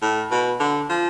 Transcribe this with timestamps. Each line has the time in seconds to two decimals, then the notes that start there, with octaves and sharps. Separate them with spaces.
0.02 A2
0.31 B2
0.60 D3
0.90 F3